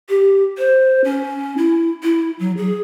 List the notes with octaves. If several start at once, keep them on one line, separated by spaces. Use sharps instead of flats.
G4
C5
C#4
E4
E4
F#3
G#4